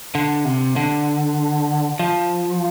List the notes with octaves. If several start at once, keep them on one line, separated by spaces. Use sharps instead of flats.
D3
C3
D3
F3